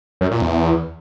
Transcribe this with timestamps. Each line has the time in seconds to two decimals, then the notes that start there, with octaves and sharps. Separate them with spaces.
0.21 F#2
0.31 A#2
0.42 E2